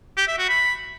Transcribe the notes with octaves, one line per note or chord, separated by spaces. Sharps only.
G4
E5
F#4
B5